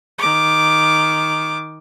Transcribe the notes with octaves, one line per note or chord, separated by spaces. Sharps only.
D#3 D6